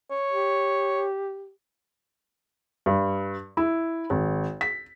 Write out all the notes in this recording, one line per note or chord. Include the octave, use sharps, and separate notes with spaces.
C#5
G4
G2
E4
G#1
B6